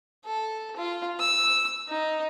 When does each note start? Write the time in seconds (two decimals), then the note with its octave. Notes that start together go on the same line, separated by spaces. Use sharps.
0.25 A4
0.76 F4
1.20 E6
1.88 D#4